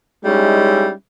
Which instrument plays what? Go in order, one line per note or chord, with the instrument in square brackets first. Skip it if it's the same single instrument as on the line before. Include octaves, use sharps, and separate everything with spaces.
[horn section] G3 G#3 C#4 D#4 E4